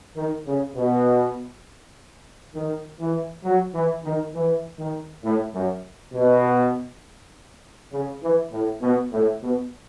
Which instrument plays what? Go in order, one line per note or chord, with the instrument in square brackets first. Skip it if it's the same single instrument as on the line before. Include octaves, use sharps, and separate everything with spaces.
[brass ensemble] D#3
C#3
B2
D#3
E3
F#3
E3
D#3
E3
D#3
A2
F#2
B2
C#3
E3
A2
B2
A2
B2